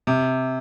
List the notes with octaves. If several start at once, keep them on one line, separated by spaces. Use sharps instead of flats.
C3